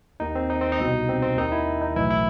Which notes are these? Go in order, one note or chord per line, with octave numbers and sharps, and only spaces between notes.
D#2 D#3 D#4
C4
D#4
C4
D#4
C2 B2
C4
C4
D#2 D#3 D#4
E4
D#4
B1 A2 E3 E4
E4